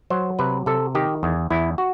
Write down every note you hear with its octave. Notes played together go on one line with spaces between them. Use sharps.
F#3 C5
C3 B4
C3 A4
D#3 G4
E2
E2 E4
F#4